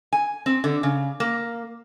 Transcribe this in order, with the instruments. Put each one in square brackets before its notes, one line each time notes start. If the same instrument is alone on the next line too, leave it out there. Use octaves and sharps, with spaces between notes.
[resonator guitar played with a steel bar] G#5
C4
D3
C#3
A#3